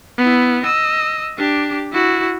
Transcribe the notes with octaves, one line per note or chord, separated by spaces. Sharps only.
B3 E4
D#5 E6
D4 G4
E4 F#4